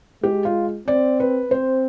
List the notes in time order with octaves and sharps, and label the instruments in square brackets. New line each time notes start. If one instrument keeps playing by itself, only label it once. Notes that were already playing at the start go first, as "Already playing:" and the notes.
[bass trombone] G#3 [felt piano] G4
[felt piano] F4
[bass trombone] C4 [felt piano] D5
[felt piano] B4
[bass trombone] C4 [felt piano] C5